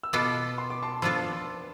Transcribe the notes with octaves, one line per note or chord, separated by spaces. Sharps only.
E6
B2 B3 F4 A4 B5 D6
C6
D6
A5 C6
F3 B3 D4 F4 A4 C6 E6